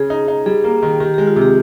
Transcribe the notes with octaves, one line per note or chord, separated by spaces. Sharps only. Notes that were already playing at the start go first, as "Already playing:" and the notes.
Already playing: C#3 G#4
D#4
D#4
G3 G#4
A#3
D#3
D#3 G4
G#3 G4
F4
C3
G4